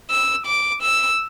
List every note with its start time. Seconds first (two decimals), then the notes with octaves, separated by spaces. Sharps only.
0.10 E6
0.47 D6
0.82 E6